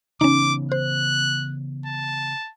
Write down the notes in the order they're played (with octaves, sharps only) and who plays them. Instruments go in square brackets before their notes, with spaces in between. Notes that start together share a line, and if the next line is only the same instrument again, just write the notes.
[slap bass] C#3 E3 B3 [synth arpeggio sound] C#4 D#4 [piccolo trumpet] D6
[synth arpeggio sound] C5 [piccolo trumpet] F#6
[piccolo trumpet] A5